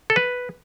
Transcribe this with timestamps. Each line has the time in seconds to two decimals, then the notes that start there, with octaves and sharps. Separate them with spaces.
0.10 A4
0.16 B4